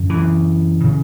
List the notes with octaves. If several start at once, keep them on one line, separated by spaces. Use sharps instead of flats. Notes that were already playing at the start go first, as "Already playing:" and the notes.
Already playing: F#2 C#3
E3
C#3